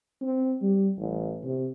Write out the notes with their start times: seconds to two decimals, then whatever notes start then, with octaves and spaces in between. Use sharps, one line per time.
0.21 C4
0.62 G3
0.99 A1
1.44 C3